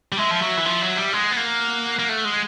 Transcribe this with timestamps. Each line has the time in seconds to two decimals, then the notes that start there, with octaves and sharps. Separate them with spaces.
0.12 G3
0.17 G#3 E5
0.31 F3
0.41 F#3
0.57 E3
0.65 F3
0.82 F#3
0.97 G3
1.13 G#3 F#5
1.32 B3
1.37 A#3
1.99 A#3
2.09 A3
2.25 G#3